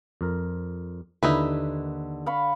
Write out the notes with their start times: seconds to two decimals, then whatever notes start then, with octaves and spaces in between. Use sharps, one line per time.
0.21 F2 A#4
1.23 D#2 D3 D#4 E4 B4
2.26 F5 B5 C#6